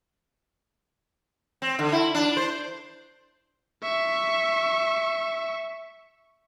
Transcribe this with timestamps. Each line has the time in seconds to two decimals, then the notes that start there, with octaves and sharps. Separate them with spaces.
1.62 C4
1.79 D3
1.92 E4
2.15 D4
2.37 C5
3.83 E5 C#6